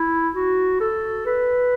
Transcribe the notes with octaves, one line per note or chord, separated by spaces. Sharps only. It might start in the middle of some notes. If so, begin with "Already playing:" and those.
Already playing: E4
F#4
A4
B4